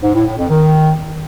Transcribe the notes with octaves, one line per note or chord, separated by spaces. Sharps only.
G#2
A2
A2
F2
D#3